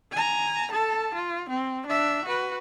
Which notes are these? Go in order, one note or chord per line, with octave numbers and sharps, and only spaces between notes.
G#5 A#5
A4 A5
F4
C4
D4 E5
F#4 B4